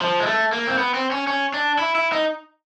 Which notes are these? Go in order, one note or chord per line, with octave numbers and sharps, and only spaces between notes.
F3
G#3
A3
A#3
C4
B3
C4
C#4
C#4
D4
E4
E4
D#4